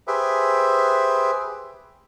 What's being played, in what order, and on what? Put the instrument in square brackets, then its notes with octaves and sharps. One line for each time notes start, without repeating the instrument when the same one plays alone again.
[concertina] G4 G#4 B4 C5 E5